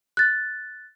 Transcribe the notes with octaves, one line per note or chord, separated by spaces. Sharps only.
F#6 A6